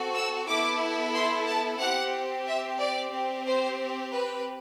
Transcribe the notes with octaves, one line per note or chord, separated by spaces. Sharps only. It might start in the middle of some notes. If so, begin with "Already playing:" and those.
Already playing: C4 F#4 A4
E6
B3 E4 A4 D6
C6
A5
C4 G4 F#5
E5
D5
C4 G4
C5
B4